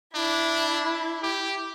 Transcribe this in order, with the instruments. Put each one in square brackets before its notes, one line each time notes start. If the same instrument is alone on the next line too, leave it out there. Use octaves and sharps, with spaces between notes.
[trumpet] D4 [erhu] E4
[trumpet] G4